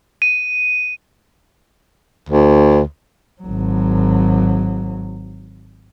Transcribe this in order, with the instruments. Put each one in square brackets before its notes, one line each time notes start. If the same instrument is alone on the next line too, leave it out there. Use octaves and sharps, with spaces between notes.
[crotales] D#7
[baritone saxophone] D2
[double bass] G#1 F#3